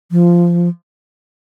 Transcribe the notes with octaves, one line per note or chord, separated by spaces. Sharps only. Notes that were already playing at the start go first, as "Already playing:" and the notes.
F3